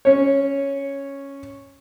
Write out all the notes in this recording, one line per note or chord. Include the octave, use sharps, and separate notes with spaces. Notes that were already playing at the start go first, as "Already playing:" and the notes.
C#4 C#5